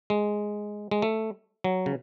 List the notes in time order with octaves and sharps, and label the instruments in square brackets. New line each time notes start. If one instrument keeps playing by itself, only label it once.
[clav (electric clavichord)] G#3
G#3
A3
F#3
C#3